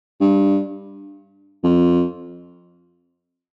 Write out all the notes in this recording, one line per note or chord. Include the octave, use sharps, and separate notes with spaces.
G2
F2